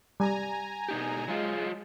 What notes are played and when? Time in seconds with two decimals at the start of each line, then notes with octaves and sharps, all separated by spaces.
0.20 G3 G#5 A#5
0.88 B2 D#4 G4
1.28 F#3 G#3 F4